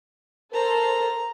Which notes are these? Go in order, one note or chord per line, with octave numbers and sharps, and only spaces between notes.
A4 A#4 C5 A#5